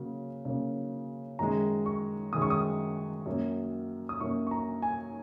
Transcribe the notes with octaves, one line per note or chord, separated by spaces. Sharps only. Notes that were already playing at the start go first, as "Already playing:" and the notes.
Already playing: C#3 F#3 A#3
C#3 F#3 A#3
F#2 D#3 G#3 A#5
C#6
F#2 D#3 G#3 D#6
C#6
D#6
F#2 F#3 A#3
D#6
F#2 F#3 A#3 C#6
C#6
A#5
G#5